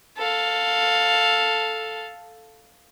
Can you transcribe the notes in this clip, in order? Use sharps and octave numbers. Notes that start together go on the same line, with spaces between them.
A4 F5